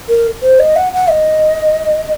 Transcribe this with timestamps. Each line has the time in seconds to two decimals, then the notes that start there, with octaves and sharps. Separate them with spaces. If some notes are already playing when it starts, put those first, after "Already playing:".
0.09 A#4
0.43 C5
0.59 D#5
0.76 F#5
0.93 F#5
1.10 D#5